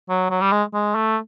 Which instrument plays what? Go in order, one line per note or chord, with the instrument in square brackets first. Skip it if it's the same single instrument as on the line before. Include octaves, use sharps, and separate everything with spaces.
[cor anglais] F#3
F#3
G3
G#3
G#3
A3